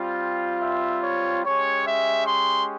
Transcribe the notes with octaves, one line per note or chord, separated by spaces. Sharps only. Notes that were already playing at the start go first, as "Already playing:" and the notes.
Already playing: G3 C4 F4
E5
C#5
G#3 C#4 G4 C#5
E5
C6